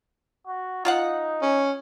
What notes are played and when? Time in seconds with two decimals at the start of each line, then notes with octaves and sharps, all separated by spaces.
0.47 F#4
0.85 D#4 F4 F5 F#5
1.42 C#4